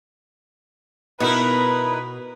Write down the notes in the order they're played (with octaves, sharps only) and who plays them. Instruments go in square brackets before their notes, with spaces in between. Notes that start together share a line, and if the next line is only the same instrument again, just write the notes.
[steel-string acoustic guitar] B2 [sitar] D#4 E4 A#4 [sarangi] B4